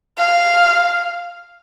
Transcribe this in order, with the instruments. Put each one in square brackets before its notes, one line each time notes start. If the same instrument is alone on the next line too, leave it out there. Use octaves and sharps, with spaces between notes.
[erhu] F5